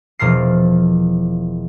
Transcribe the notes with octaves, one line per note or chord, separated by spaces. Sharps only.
E1 F3 A#4 F6 A6 C7